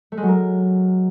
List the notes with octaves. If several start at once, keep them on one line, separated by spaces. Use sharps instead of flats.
A3
G#3
F#3
A#4